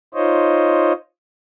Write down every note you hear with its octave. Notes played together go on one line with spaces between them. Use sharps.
D#4 F4 C5 C#5 D#5